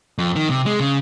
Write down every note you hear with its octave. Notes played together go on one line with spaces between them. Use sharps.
F2
D#3
C3
G#3
C#3